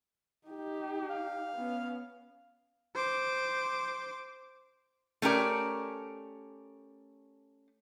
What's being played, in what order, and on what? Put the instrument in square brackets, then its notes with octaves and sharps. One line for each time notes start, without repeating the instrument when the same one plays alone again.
[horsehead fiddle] D#4 G4
[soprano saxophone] F5
[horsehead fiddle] B3 C#4
[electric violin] C5 D6
[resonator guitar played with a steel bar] A3 C#4 G4 A#4 D5